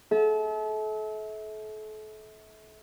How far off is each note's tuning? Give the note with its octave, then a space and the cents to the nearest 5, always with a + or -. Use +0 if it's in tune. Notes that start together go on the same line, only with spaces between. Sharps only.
A4 -35 E5 -35